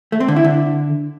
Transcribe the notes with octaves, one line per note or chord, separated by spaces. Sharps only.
A3
C4
D3
E4
D3